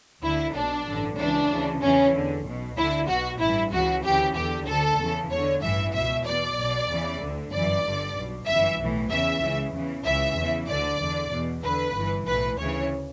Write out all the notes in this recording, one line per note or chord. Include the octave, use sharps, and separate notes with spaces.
D2 D3 E4
B1 B2 D4
A1 G2 D3
C#2 C#3 E3 D4
D2 C#3 E3
E2 C#3 E3 C#4
E2 D3
B1 B2
D2 D3 E4
B1 B2 F#4
A1 G2 E3 E4
C#2 C#3 E3 F#4
D2 C#3 E3 G4
E2 D3 G4
D2 D3 A4
E2 C#3 E3
E2 D3 C#5
A1 G2 E3 E5
C#2 B2 E5
E2 B2 D5
B1 B2
E2 C#3 E3
D2 D3
G1 F#2 E3 D5
G1 G2 D3
B1 B2
G1 F#2 E3 E5
B1 A2 E3
E2 C#3 E3 E5
C#2 C#3 E3
E2 C#3 E3
C#2 C#3 E3 E5
E2 C#3 E3
D2 D3 D5
E2 D3
E2 B2
E2 D3 B4
G1 G2 E3
B1 A2 E3 B4
D2 C#3 E3 C#5